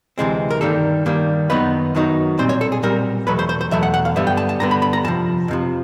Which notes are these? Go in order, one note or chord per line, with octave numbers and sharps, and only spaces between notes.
D2 C3 E3 G#3 C4
A#4
G2 D#3 G3 A#3 A4
G2 D#3 G3 A#3
F#2 D#3 F#3 B3 D#4 B4
F#2 D#3 F#3 B3 D#4
B1 A#2 G3 C4 C5
C#5
A4
G#4
B1 A#2 G3 C4 A#4
E2 B2 F#3 A3 B4
C5
C5
C5
E2 B2 F#3 A3 E5
F#5
F#5
F5
G2 D3 G3 B3 E5
G5
A5
A5
G2 D3 G3 B3 A#5
B5
B5
A#5
F2 C3 F3 A5
F2 C3 F3